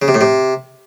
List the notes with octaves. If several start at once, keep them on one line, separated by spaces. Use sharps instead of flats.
C#3
C3
A2
C3